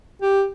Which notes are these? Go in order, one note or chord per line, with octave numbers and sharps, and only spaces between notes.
G4